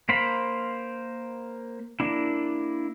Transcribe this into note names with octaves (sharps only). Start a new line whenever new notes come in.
A#3 C5 F5 B5
A#3 D4 E4